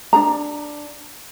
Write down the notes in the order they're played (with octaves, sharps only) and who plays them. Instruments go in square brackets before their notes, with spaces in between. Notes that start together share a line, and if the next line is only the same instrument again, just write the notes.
[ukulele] D4 G#4 A#5